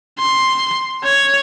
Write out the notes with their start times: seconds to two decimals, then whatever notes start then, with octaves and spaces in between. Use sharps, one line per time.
0.19 C6
1.04 C#5